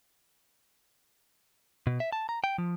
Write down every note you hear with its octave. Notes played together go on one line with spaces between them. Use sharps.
B2
E5
A5
A#5
G5
F3